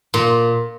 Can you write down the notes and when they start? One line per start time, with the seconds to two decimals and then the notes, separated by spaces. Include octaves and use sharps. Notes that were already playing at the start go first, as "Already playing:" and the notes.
0.14 A#2